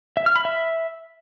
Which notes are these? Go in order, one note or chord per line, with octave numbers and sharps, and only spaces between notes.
E5
F6
B5
E5